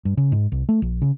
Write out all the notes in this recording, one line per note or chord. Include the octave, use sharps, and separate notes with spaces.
G2
C#3
G#2
C2
A3
A#1
C#3